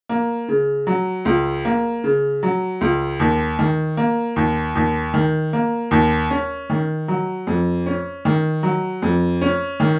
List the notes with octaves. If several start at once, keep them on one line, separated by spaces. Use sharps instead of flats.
A#3
C#3
F#3
C#2
A#3
C#3
F#3
C#2
D#2
D#3
A#3
D#2
D#2
D#3
A#3
D#2
C#4
D#3
F#3
F2
C#4
D#3
F#3
F2
C#4
D#3